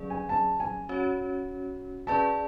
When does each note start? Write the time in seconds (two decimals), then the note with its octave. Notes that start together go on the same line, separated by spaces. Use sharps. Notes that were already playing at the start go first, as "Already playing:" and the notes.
Already playing: D3 F#3 C#4 G#4 D5
0.10 G#5
0.29 A5
0.60 G#5
0.89 C#4 F#4 C#5
2.07 C#4 G#4 B4 D5 A5